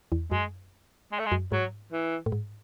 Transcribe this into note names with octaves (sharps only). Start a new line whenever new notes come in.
E2
F#2 G#3
G#3
A3
G#3
F#2
G#2 F#3
E3
A2
G#2